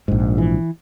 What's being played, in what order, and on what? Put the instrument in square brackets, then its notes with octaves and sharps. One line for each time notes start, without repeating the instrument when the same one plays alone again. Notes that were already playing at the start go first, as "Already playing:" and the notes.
[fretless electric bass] A#1 G#2
E3